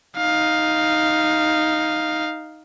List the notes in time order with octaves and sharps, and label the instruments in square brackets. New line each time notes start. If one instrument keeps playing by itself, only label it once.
[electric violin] D#4 F5